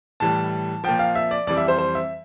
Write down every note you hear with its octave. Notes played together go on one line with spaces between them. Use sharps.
A2 E3 G3 A5
A#2 F3 G5
F5
E5
D5
F2 E3 G3 D5
E5
C5
C5
E5